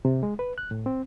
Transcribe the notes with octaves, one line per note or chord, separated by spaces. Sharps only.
C3
G#3
B4
F#6
A2
C4